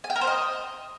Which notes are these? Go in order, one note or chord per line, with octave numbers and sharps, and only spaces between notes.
G#5
G5
A#4
C5
D#5